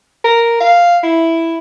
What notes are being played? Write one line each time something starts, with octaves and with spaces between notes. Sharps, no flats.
A#4
F5
E4